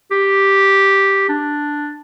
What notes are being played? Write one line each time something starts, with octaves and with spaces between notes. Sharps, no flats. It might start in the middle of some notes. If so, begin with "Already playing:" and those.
G4
D4